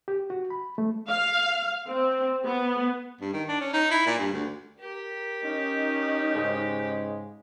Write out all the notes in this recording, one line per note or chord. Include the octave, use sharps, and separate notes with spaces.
G4
F#4
B5
A3
F5
C4
B3
G2
D#3
D4
C#4
D#4
E4
A#2
G2
D2
G4 A#4
C#4 D#4
G#2 C#3 G#3